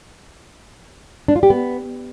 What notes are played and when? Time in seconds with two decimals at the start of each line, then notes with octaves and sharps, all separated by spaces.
1.28 D4
1.36 F4
1.43 G4
1.50 B3